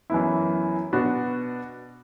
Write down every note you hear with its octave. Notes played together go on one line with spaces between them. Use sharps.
F#2 E3 B3 E4
B2 B3 D4 F#4